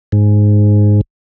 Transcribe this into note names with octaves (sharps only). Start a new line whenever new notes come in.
G#2